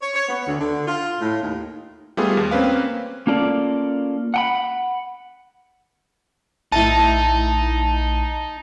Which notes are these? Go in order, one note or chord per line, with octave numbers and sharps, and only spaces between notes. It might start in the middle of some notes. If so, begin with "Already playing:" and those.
C#5
C#5
B3
D2
D3
F4
A2
D#2
G3 A3 B3 F4 G#4
D#2
A#3 C4 C#4 B4 F5
A#3 C#4 F4 A4 A#4 D5
F#5 G5 B5
A#1 A2 D#4 E5 A5 D#7